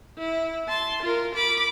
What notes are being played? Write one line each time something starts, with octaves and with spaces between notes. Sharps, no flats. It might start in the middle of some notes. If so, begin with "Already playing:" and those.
E4
A5 C6
F4 A#4
B5 D6